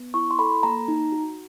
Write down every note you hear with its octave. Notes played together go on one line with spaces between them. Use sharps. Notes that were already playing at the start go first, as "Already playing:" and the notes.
Already playing: B3
E4 C#6
C6
A4 B5
A#3 A#5
D#4
F#4